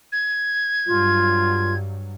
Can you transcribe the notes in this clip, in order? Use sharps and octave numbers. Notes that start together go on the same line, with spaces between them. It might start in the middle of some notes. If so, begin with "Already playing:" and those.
G#6
G2 F#3 F4